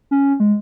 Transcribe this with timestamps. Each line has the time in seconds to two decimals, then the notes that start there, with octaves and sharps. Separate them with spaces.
0.11 C#4
0.40 G#3